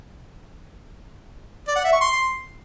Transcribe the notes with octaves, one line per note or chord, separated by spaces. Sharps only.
D5
F#5
E5
C#6
C6